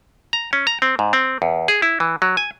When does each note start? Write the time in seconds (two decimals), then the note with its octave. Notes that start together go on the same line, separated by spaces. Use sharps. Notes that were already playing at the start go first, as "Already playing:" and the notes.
0.33 A#5
0.53 C#4
0.67 A#5
0.82 C4
0.99 G#2
1.13 C4
1.42 E2
1.68 G#4
1.82 E4
2.00 E3
2.22 F#3
2.37 G#5